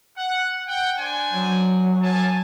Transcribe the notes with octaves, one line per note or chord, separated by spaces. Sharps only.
F#5
F#5 G5
D4 C5 G#5
F#3
G#5 A5